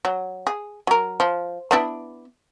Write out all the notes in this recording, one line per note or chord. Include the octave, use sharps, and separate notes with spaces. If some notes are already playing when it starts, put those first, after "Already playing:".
F#3
G#4
F#3 A#4
F3
B3 D4 E4